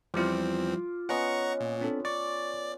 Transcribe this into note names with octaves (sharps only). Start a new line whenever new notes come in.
E2 F3 G3 C4 E4 F4 D6
B3 C#4 F4 D#5 F#5 A#5 C#6
A#2
C4 D4 A4
D5 C#6 D6 A6